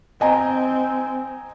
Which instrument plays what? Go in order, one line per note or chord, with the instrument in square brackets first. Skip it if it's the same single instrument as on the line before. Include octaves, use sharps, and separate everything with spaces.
[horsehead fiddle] C4 [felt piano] D#5 G#5 A#5